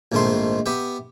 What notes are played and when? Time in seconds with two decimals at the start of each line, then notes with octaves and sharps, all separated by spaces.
0.12 A#1 G#2 D#3 A3 C4 C6
0.66 B3 G4 E5